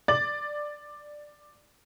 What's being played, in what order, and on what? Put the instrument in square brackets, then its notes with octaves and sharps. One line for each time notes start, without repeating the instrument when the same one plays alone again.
[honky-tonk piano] D5 D6 A6 F#7